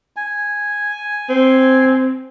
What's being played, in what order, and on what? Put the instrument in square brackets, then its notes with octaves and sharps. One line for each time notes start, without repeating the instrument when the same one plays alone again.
[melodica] G#5
[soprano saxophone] C4